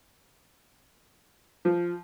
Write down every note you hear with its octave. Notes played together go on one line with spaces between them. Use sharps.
F3